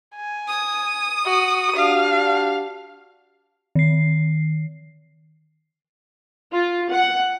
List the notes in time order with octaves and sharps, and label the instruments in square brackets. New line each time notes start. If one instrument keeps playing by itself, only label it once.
[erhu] G#5
[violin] D#6
[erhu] F#4
[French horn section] D4 F#4 G4 [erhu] F5
[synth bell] D#3 C7
[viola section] F4
F#5